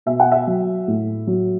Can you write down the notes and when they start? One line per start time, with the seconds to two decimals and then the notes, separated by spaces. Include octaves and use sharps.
0.06 B2 E5
0.20 F#5
0.32 E5
0.47 F#3
0.88 A2
1.27 F#3